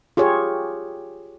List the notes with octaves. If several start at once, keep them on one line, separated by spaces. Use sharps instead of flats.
F4 G4 G#4 C#5